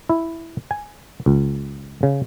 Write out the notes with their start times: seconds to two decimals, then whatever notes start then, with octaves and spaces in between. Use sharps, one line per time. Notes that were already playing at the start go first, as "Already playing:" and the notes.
0.09 E4
0.71 G#5
1.26 C#2
2.03 C#3